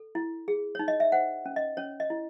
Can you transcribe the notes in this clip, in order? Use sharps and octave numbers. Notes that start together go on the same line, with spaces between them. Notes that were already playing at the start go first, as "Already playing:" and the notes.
Already playing: A4
E4
G#4
D#4 C#5
D#5
E5
C5 F#5
C#4
D#5
C#4 C#5
D#5
E4